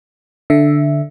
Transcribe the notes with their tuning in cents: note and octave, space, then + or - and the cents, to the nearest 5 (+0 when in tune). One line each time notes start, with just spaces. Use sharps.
D3 +0 D4 +0 E5 +0